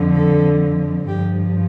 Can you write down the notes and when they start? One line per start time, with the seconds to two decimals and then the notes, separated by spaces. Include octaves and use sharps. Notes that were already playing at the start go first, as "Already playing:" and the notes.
Already playing: F2 D3 F3
0.15 A4
1.08 G2 F3 G4